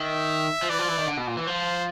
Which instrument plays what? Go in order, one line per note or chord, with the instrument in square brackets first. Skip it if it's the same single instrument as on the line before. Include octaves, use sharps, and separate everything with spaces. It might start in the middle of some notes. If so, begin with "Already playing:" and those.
Already playing: [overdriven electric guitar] D#3 [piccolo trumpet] E5
[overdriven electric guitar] F3
[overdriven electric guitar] E3 [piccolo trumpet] D5
[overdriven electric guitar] F3
E3
D#3
D3
B2
A#2
E3
[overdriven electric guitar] F3 [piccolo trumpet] C5